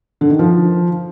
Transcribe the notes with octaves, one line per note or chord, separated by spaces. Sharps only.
D3
D#3
F3